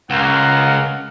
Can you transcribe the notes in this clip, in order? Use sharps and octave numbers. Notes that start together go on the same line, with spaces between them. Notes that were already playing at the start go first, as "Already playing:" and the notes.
C#2 A#4 F5 F#5